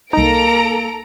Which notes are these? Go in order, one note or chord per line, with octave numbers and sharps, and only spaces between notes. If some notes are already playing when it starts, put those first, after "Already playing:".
C2 A#3 D#4 A4 A#5 D7